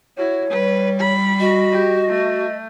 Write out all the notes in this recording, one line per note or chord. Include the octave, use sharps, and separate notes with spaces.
E4 F#4 C#5
G3 B4
B5
F#4 D#5
G4
A3